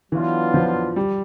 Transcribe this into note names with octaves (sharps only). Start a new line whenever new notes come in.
E3 F#3 B3 D4 F4
F3
G3